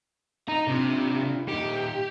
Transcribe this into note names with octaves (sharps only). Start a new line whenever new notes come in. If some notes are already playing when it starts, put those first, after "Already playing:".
D#4 A#5
C3 D4 F4
A#2 D#4 G4